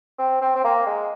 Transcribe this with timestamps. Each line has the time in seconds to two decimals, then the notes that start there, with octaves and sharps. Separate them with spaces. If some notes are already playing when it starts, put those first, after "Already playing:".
0.18 C4
0.41 C4
0.55 C4
0.64 A#3
0.86 G#3